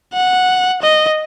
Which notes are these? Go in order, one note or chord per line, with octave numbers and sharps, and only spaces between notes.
F#5
D#5